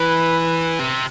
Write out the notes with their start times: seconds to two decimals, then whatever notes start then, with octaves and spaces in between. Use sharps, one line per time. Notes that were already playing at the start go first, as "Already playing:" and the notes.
Already playing: E3 B4
0.79 C3